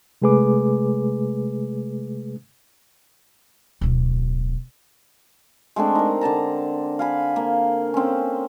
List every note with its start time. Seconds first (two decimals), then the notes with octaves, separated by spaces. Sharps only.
0.22 C3 G#3 A3 G#4 B4 D6
3.81 D1 B2
5.76 G#3 A3 C4 D4
5.95 D#4 A#4
6.21 D3 D5 A5 A#5
6.99 F5 G#5 B5
7.36 A#3
7.94 C4 C#4